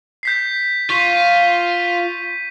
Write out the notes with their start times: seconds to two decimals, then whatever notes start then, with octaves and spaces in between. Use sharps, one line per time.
0.23 G6 B6 C7
0.90 F4 C#6 B6 D#7